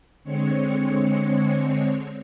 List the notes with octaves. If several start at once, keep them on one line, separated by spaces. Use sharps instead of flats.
D3 G#3 C4 C#5 C#7